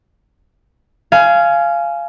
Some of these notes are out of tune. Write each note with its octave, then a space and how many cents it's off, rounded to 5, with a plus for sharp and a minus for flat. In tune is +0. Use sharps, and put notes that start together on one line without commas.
F5 -15 G#5 +15